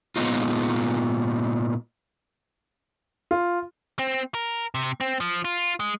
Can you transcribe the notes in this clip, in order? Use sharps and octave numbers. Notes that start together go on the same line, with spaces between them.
A#2 G#3 B3 C#4 D#4 F4
F4
C4
A#4
C3
C4
F3
F4
G#3